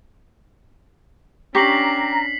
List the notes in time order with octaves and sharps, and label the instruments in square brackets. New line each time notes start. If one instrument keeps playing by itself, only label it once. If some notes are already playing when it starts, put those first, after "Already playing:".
[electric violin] C#4 D4 [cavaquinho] G4 C#6 [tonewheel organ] A#5 [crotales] B6 C7 F#7